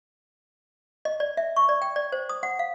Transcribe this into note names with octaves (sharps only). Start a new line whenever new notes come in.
D#5
D5
E5
C#6
D5
G5
D5
C5
D#6
F#5
F5